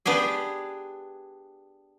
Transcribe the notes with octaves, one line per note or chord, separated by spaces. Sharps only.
B3 D4 G4 G#4